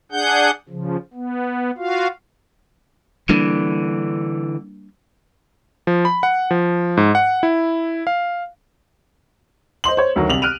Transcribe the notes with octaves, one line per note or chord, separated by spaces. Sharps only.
D4 G#4 F#5 G6
C#3 F3
B3
F4 F#4 F5
D3 E3 G3 A#3 D4
F3
B5
F#5
F3
G#2
F#5
E4
F5
C5 D#5 C6 F#7
C5 C#5
D2 D#3 F#3
C2 F7 F#7
F6 F#6 D7 D#7 F7